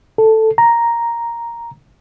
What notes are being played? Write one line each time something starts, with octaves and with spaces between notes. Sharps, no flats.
A4
A#5